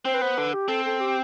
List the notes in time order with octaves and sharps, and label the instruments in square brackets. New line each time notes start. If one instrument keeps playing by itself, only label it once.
[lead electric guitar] C4 [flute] C5
[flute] B4
[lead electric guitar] B3 [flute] C5
[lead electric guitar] D3 [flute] B4
[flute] G4
[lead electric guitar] C4 [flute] A4
[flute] A4
G4